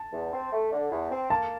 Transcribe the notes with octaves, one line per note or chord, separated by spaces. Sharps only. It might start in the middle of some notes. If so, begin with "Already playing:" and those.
Already playing: A5
E2
C4
A3
D3
E2
C4
A#3 A5